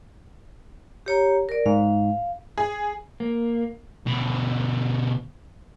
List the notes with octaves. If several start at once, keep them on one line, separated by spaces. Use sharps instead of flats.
G4 C#5 A#5
A#4 D5
G#2 F5
G#4
A#3
B2 D3